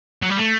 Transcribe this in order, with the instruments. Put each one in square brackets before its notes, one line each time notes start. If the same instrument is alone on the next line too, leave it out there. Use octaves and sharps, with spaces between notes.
[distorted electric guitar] F#3
G3
A3